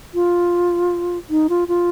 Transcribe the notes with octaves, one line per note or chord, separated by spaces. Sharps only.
F4
D#4
F4
F4